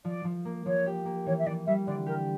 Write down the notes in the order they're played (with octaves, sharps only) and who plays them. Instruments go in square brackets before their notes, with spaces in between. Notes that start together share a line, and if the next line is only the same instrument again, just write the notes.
[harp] F3 [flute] D5
[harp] F3
A#3
[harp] F3 [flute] C#5
[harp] G4
A#3
[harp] E3 [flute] C#5
[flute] E5
[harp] E3 [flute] D5
[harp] G3 [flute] E5
[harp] D3 [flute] D5
[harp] G4 [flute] A#4